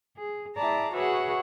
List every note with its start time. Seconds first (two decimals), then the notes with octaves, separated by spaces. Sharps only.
0.16 G#4
0.56 E4 G#4 D5 A5 A#5
0.93 F#4 G#4 B4 C#5 E5 F#5